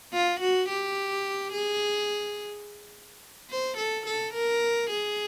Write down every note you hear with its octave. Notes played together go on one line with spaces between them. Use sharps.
F4
F#4
G4
G#4
C5
A4
A4
A#4
G#4